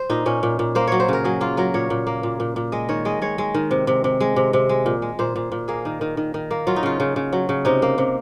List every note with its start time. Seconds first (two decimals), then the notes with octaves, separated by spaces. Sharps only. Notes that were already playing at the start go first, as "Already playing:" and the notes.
Already playing: C5
0.10 A#2 D#4
0.26 A#2 C#4
0.43 A#2
0.59 A#2
0.75 A#3 C5
0.87 F#3 C#5
1.00 C5
1.08 C#3 A#4
1.24 F#3 G#4
1.41 A#3 F4
1.57 F#3 A#4
1.74 A#2 C#5
1.90 A#2
2.07 A#3
2.23 A#2
2.40 A#2
2.56 A#2
2.72 G#3 D#5
2.89 D#3 C#5
3.05 G#3 D#5
3.22 G#3 C#5
3.38 G#3
3.54 D#3
3.71 C3
3.87 C3
4.04 C3
4.21 G#3
4.36 C3
4.53 C3
4.69 G#3
4.86 A#2
5.02 G#3
5.19 A#2 C5
5.36 A#2
5.52 A#2
5.68 A#3 G#4
5.85 D#3
6.01 D#3
6.17 D#3
6.34 D#3
6.51 A#3
6.67 F#3 F4
6.76 D#4
6.83 C#3 F4
7.00 C#3
7.16 C#3
7.33 F#3
7.49 C#3
7.65 C3 D#4
7.82 A#3
7.98 C3